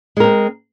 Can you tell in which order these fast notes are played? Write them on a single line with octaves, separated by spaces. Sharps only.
G#3 A#4 C4